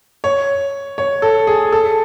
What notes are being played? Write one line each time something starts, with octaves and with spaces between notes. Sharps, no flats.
C#5
C#5
A4
G#4
A4